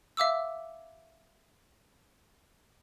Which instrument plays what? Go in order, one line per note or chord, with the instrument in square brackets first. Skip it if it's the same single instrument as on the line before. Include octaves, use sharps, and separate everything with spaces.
[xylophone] E5 F5 D6 E6